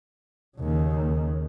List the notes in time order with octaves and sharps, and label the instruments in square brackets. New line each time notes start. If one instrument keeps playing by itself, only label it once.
[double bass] D#2 C#3